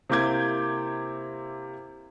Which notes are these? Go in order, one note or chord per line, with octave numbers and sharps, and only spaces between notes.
C3 A#3 E4 D6 G6 G#6